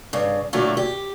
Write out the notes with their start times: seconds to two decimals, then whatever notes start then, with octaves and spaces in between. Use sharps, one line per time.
0.13 G2 C#3
0.53 A#2 D3 F#3 A3 E4 F4
0.77 G4